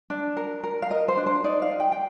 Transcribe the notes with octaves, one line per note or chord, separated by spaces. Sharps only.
D4
A#4
A#4
F5
A#4 D#5
C5
D4
C5
D#4 D5
F5
D#4
G5
G5